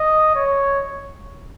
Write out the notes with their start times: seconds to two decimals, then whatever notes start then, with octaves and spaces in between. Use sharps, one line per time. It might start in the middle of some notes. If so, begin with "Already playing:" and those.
Already playing: D#5
0.36 C#5